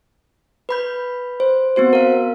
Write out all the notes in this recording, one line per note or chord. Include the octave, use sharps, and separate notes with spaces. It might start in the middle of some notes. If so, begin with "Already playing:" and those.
B4 B5 G6
C5
B3 C4 F#4 C5
A#4 F5